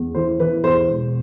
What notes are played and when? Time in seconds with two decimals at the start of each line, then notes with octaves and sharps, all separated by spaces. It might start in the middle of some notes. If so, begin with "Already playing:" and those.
Already playing: E2
0.15 E3 C5
0.40 E3 B4
0.63 E2 C5
0.88 E1